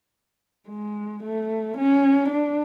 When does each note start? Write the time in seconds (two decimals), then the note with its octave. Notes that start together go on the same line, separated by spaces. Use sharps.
0.69 G#3
1.23 A3
1.77 C#4
2.31 D4